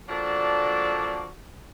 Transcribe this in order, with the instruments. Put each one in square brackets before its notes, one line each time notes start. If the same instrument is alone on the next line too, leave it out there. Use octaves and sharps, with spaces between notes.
[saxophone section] F3 A#3 D4 F#4 A4 D5